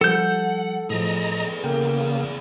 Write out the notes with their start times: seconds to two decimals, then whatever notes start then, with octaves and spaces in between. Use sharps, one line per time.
0.01 F3 G3 A4 F#5 G6
0.90 E2 A2 F3 G#4 D#5 A#5
1.64 C#3 A#3 A#4 G5